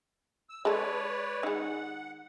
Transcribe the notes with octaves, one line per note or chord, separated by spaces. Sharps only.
E6
G#3 A4 B4 C#5 D5
D#3 G#3 F#5